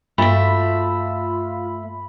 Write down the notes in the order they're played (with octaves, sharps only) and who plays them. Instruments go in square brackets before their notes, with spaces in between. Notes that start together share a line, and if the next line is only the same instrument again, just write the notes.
[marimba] G2 [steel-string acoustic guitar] A3 E5 [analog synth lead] F4 [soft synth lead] B5